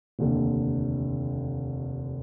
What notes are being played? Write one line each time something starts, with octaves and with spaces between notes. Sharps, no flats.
F1 D#2 D3